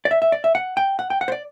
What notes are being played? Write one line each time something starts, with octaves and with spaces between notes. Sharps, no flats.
D5
E5
E5
D5
E5
F#5
G5
F#5
G5
F#5
C5
D5